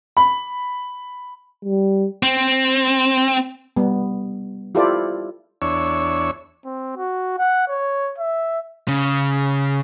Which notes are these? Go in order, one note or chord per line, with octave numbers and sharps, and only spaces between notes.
B5
G3
C4
G3 B3
E4 F4 G4 A4 C5 D5
E2 D4 C#5 C#6 E6
C4
F#4
F#5
C#5
E5
C#3